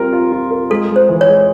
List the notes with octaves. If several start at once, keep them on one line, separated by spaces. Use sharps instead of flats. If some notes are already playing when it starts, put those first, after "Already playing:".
Already playing: G3 C4 F4 A#4
F4
F4
A#4
G#3 A4
G#3
C5
E3
C#5
G#3